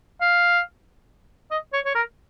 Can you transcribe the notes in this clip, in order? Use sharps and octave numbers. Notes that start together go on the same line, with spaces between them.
F5
D#5
C#5
C#5
A#4